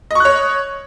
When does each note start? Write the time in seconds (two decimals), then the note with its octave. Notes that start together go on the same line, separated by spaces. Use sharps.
0.11 D#5
0.15 C#6
0.20 F#6
0.25 C#5